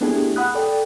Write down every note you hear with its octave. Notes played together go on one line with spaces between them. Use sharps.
A3 B3 D4 E4 G4 G#4
F#5 B5 D#6 F#6
A4 D5 G5